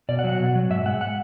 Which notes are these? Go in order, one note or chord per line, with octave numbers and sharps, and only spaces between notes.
B2 D5
F#5
F#3
F#5
B2
F#3
G#2 E5
G#3 F#5
F#5